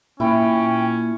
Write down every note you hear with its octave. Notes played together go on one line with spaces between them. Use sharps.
A#2 C#4 E4 G5